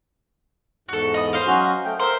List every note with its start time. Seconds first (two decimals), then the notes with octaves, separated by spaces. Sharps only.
0.89 E2 G#2 F#4 A4
1.14 D#5 B5 D#6
1.33 C5 D#5 F5
1.47 F#3 C#4 F#4
1.85 A3 G5
1.99 A#4 C5 E5